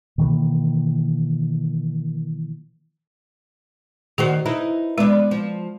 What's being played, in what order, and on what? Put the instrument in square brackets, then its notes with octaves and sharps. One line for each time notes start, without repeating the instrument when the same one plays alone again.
[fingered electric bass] B2 D#3 E3 A#3
[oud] D#3 F#4 C5 [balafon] G#4
[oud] D#4 E4 B4
[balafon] G#3 [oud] B3 D4
[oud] F3